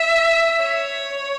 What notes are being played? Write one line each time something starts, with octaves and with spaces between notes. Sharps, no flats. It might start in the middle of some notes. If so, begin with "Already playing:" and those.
Already playing: E5
C#5